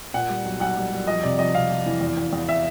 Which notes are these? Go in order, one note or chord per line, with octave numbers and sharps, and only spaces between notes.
A#2 F#5
G3
B1
B1 F#5
G3
G3
F2 D#5
C3 D5
F2 D#5
C3 F5
F2
E3
E2
E2
E2
E5